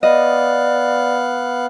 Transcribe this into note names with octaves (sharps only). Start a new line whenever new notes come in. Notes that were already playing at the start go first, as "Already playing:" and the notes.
B3 D5 D#5 F5 F#6